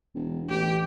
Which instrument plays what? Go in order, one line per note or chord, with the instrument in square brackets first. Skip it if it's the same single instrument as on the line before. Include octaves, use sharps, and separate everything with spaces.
[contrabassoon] E1
[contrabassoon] A1 [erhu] G4